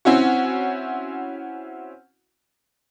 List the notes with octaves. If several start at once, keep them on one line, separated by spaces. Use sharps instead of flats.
C4 C#4 E4 F#4